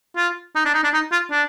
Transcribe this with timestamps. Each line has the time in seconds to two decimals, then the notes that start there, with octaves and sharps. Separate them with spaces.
0.16 F4
0.56 D#4
0.65 D4
0.74 D#4
0.84 D4
0.94 D#4
1.12 F4
1.31 D4